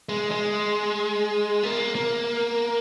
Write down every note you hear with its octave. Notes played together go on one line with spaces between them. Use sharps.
G#3
G#3
A#3
A#3